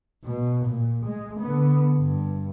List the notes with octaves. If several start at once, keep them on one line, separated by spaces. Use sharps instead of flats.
B2
A#2
G#3
D3 B3
G2